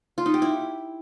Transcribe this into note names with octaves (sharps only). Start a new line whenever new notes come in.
F4
D#4
G4
E4